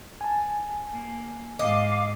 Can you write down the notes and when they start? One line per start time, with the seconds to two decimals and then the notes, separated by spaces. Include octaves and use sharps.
0.21 G#5 A5
0.93 A#3
1.59 G#2 D#5 F5 D6